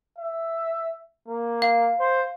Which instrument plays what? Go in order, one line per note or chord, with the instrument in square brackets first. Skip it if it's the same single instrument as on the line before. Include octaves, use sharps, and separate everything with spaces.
[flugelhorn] E5
A#3
[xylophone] F5
[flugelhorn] C5